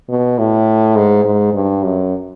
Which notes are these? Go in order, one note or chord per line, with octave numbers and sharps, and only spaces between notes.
B2
A2
G#2
G#2
G2
F#2